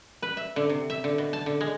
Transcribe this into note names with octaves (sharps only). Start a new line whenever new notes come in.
B4
E5
D3
C3
E5
D3
B2
A5
D3
G#3